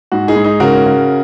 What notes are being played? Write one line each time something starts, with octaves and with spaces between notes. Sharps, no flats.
G#2 F#4
D#4 G#4
G#2
D#4 G#4
C#3 F#4 A#4
C#3